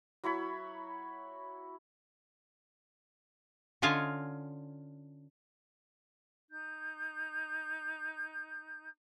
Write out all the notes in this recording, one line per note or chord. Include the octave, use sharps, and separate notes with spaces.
F#3 E4 C#5 B5
D3 C#4 F4 D#5 F5 G#5
D#4 G6